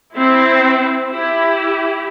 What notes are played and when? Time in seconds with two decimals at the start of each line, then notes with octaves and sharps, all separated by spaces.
0.15 C4 E4
1.12 E4 G4